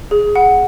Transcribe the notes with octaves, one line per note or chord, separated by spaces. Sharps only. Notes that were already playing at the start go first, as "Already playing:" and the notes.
G#4
F#5